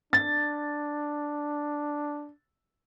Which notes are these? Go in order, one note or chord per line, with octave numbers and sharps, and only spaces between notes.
D4 A6